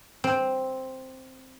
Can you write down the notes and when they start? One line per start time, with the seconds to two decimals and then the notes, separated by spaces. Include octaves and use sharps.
0.24 C4